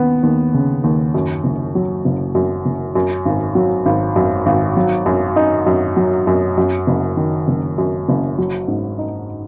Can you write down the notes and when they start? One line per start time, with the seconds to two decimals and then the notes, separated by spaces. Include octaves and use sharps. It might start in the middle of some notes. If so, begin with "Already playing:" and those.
Already playing: D#2 B3
0.23 D#2
0.54 C#3
0.84 D#2
1.15 F#2
1.44 F#1
1.75 F#3
2.05 F#1
2.35 F#2
2.66 F#1
2.95 F#2
3.26 G#1
3.55 F#3
3.86 G#1
4.16 F#2
4.46 G#1
4.77 F#3
5.06 F#2
5.36 D#4
5.66 F#2
5.97 F#3
6.27 F#2
6.58 F#2
6.87 F#1
7.17 D#3
7.48 F#1
7.78 F#2
8.09 F#1
8.38 F#3
8.68 G#2
8.99 D#4